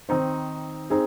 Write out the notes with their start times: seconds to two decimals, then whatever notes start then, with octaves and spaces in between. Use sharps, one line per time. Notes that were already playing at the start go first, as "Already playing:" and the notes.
0.09 D#3 C4 D#4 C5
0.90 C4 D#4 G#4